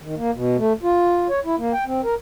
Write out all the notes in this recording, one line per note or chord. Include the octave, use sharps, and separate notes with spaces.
D#3
A#3
B2
A3
F4
C#5
E4
A#3
G5
C4
A#4